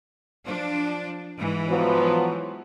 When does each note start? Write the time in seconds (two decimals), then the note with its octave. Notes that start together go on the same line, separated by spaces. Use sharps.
0.45 F3 D4
1.37 G#2 E3
1.69 F3 F#3 B3